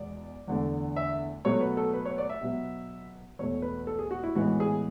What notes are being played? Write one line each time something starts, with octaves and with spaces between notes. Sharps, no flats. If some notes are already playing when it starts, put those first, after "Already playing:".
Already playing: E2 B2 G#3 B3 D5
E2 D3 A3
E5
B2 F#3 A3 C#5
B4
A4
B4
C#5
D5
E5
B2 F#3 B3
E2 B2 A3 C#5
B4
A4
G#4
F#4
E4
A2 E3 G#3 B3 F#4
G#4